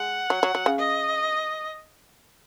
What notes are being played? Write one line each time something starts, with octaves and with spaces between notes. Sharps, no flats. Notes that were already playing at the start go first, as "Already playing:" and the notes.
Already playing: G#3 F#5
F#3
F#3
F#3
C#3
D#5